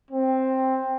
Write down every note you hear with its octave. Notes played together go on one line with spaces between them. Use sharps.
C4